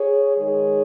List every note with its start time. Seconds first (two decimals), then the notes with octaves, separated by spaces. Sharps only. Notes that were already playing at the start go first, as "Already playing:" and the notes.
Already playing: G#4 C#5
0.37 D#3 G#3 D#4 G#4 C#5